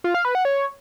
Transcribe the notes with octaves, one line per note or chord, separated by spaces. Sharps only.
F4
F5
B4
F#5
C#5